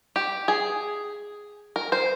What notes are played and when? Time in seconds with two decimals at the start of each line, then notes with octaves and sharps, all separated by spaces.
0.16 G4
0.48 G#4
1.76 A#4
1.92 C5